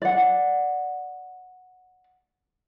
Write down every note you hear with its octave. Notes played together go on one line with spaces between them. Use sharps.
D5 F#5